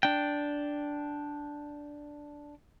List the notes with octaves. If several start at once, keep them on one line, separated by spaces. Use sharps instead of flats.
D4 G5